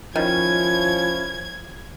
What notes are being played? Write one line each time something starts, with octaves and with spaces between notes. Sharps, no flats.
D#3 F3 C#4 E4 G#6